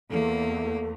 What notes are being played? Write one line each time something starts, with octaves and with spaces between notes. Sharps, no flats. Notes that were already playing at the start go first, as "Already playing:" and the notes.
E2 A3 A#3 A4